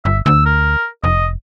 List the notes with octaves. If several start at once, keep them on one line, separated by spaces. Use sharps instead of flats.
G1 E5
D2 E6
A#4
F1 D#5